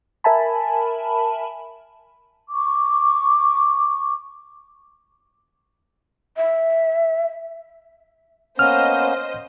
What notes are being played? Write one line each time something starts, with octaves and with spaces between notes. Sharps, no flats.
A#4 E5 G#5 A5 B5
C#6 D6
E5
A#3 B3 C#4 C5 D#5 F6